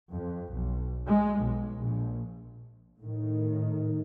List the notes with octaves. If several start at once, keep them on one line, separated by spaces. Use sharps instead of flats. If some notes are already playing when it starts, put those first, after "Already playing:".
F2
B1
G#3
B1
A#1
A2 D#3